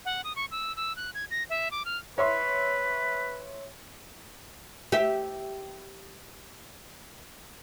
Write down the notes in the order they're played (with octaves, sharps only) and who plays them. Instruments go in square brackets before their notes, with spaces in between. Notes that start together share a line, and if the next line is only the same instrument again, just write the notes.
[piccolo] F#5
D#6
C#6
E6
E6
F#6
G#6
A#6
E5
D6
F6
[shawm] B4 [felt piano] C#5 E5 C6
[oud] G4 E5